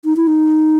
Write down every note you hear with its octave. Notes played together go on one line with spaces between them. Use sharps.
D#4
E4
D#4